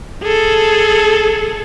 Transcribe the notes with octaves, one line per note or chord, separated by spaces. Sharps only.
G#4 A4